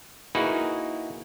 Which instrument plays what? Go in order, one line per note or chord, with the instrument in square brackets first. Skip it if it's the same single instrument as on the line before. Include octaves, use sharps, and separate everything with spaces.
[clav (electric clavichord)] A#3 D#4 E4 F#4 G#4 B4